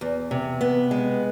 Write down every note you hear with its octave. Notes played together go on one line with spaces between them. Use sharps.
E2
C3
B3
G#3